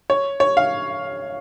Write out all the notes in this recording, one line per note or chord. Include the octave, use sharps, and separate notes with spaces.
C#5
C#5
F5